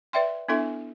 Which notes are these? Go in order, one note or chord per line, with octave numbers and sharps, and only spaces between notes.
B4 D5 E5 G5 C6
B3 D4 E4 A4 E5 G#5